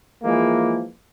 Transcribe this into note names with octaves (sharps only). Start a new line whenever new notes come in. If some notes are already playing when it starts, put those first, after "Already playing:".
E3 F3 G#3 A#3